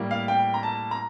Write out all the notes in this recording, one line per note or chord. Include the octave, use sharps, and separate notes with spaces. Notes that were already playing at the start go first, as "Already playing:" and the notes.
Already playing: A2 G3 A#3
F5
G5
A#5
A5
A#5